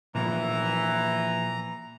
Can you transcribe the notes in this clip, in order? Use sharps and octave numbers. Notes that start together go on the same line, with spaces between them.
A#2 E3 F3 B3 A#5